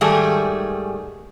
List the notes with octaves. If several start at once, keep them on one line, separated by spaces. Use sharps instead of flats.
G#2 D#3 G3 A3 G#4